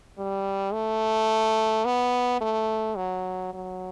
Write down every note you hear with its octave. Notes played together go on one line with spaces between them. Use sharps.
G3
A3
B3
A3
F#3
F#3